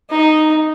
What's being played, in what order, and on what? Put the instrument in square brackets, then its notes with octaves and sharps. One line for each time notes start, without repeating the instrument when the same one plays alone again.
[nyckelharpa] D#4